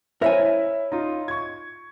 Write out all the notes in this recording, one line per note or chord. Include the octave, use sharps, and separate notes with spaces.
E4 A#4 C5 C#5 E5 G#5
E5
D#4 F4
C#6 G#6